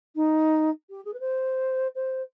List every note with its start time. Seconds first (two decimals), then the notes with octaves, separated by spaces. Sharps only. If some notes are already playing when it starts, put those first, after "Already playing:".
0.15 D#4
0.89 G4
1.04 G#4
1.13 B4
1.19 C5
1.94 C5